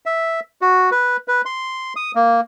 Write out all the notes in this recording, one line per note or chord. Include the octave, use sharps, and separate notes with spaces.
E5
F#4
B4
B4
C6
D#6
A#3